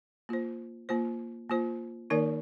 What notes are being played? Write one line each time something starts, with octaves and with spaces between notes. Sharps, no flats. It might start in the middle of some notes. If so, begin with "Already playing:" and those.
A#3 F4 C5
A#3 F4 C5
A#3 F4 C5
D#3 A#3 D#4 A#4 D5